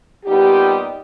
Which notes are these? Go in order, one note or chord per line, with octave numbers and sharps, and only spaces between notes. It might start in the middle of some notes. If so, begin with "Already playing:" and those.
A#2 G3 B3 D#4 G4